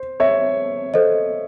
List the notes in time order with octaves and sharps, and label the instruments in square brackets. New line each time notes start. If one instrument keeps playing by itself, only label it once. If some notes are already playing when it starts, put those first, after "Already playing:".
Already playing: [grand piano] C5
C#5 E5
[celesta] A4 C5 D#5